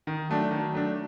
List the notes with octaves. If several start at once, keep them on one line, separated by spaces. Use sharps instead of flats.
D#3
F#3 A3 D4
D#3
F#3 A3 D4